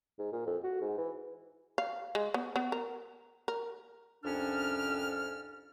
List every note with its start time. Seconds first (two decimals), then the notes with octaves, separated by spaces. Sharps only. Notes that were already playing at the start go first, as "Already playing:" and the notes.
0.18 G#2
0.32 A#2
0.46 F2
0.63 F#4
0.81 G#2
0.98 E3
1.78 F5
2.15 G#3
2.34 B3
2.56 B3
2.72 A#4
3.48 A#4
4.24 C2 F2 C#4 D4 F6